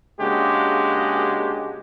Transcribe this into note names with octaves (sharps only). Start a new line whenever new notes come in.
C#3 G#3 A#3 D4 F#4 G4